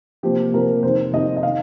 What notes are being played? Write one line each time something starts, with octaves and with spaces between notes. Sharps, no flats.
C3 F3 A#3 G4
C3 F3 A#3 A#4
F2 C3 D#3 C5
F2 C3 D#3 D#5
D#5
D#3 F5